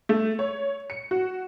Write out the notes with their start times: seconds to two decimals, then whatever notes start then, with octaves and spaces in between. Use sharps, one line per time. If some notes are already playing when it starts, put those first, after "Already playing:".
0.09 A3
0.39 C#5
0.90 C#7
1.11 F#4